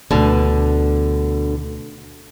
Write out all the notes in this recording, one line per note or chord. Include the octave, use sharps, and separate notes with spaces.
D2 B2 D3